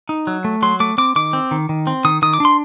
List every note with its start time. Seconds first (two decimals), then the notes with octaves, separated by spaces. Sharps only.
0.09 D#4
0.27 F#3
0.45 A3
0.62 F#3 C6
0.80 A3 D6
0.98 C4 D6
1.16 D#3 D6
1.33 C4
1.51 D#3
1.69 D#3
1.87 C4
2.05 D#3 D#6
2.22 D#3 D#6
2.33 D6
2.40 D4 C6